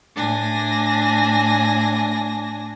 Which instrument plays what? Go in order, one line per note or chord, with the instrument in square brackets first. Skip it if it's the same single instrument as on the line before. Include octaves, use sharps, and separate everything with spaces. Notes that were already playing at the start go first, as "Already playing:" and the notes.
[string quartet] A2 D4 G#5 A#6